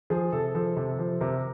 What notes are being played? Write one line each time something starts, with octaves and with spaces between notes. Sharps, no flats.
F3 G#4
C3 A4
F3 A4
C3
F3
C3 A#4